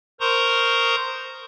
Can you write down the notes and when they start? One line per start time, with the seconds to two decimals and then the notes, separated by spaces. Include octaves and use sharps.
0.20 A#4 C5 A#5 C6 C#6 D#6